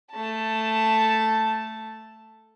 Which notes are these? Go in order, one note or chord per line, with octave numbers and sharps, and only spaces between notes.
A3 A5